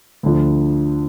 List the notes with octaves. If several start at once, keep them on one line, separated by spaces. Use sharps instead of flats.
D2 D3 F3